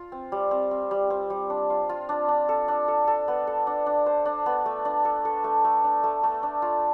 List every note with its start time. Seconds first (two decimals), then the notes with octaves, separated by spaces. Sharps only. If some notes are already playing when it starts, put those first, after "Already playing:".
Already playing: F4
0.12 C4
0.32 G3
0.51 C4
0.71 C4
0.91 G3
1.10 C4
1.30 G3
1.50 D4
1.70 F4
1.89 F4
2.09 D4
2.28 D4
2.49 A4
2.68 D4
2.88 A4
3.08 A4
3.28 B3
3.47 A4
3.67 D4
3.86 D4
4.06 C5
4.26 D4
4.46 B3
4.66 A3
4.85 D4
5.05 A4
5.25 A4
5.44 A3
5.65 A3
5.84 D4
6.04 A3
6.23 A3
6.43 D4
6.62 F4